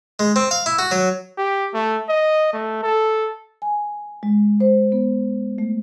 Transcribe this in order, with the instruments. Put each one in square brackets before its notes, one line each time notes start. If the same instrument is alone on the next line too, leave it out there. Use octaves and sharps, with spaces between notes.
[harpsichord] G#3
C4
F5
E4
F#4
F#3
[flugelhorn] G4
A3
D#5
A3
A4
[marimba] G#5
G#3
C5
B3
A3